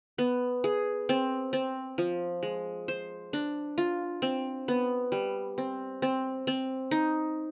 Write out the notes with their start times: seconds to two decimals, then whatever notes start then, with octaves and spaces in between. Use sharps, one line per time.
0.18 B3
0.64 G#4
1.09 C4
1.53 C4
1.98 F3
2.43 G#3
2.88 C5
3.33 D4
3.78 F4
4.22 C4
4.68 B3
5.12 G3
5.58 C4
6.02 C4
6.47 C4
6.91 D#4